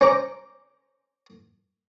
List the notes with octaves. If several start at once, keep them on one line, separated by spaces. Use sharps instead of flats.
C#4 C5 A#5 D6